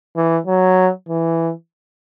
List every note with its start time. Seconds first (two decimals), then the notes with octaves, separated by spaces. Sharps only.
0.16 E3
0.47 F#3
1.09 E3